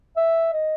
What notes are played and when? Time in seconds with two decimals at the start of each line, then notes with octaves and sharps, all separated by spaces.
0.17 E5
0.53 D#5